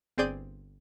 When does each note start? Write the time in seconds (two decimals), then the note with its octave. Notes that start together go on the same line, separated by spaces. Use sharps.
0.18 G1 C4 G#4 D5 G6 D#7